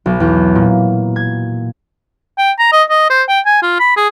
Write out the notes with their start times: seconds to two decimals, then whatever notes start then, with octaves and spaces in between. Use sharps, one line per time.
0.06 B1
0.20 E2
0.55 A#2
1.16 G#6
2.38 G5
2.59 A#5
2.72 D#5
2.90 D#5
3.10 C5
3.29 G5
3.46 G#5
3.62 F4
3.80 B5
3.97 G#4